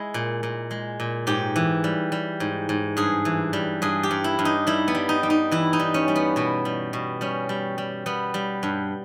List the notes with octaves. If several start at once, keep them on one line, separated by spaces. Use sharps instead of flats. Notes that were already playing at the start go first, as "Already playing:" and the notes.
Already playing: G#3 E4
A#2
A#2
G#3
A#2
G#2 G4
E3
G3
G3
G#2
G#2
G2 G#4
E3
G3
G2 G#4
G4
G2
E4
G2
D#4
G3 E4
B3
G3
D#4
G3
D#4
E3 E4
D#4
G3
C#4
G3
B3
B2 B3
G3
B2
G3 C#4
G3
G3
G3 B3
G3
G2